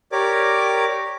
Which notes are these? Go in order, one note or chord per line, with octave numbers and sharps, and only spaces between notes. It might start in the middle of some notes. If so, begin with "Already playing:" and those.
G4 A#4 C#5 D5 D6